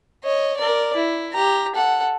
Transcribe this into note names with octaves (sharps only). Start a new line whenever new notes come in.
C#5 D#5
A#4 D5
E4
G4 A#5
A4 F#5